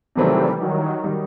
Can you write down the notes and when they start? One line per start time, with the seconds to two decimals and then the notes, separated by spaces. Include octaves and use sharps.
0.16 C3 D#3 E3 F#3 G3 A3 C4
0.60 D#3 F#3
1.04 D#3 G3 D#4